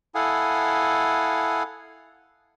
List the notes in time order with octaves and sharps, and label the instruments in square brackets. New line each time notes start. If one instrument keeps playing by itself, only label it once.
[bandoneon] E4 A4 F5 F#5 G#5 D#6